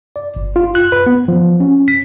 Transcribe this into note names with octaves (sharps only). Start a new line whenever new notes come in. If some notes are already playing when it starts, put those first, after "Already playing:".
D5
G1
F4
F#6
B4
B3
F3
C#4
B6